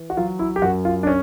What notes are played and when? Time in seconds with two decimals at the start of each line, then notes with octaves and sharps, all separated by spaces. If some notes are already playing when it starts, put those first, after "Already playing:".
Already playing: E3
0.10 F#4
0.17 F#3 F4
0.39 E4
0.56 G4
0.62 F#2 F#4
0.85 F4
1.03 D4
1.07 C#4